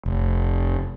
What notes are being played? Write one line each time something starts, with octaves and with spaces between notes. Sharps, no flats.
F1